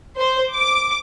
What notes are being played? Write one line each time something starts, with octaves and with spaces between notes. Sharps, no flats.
C5
D6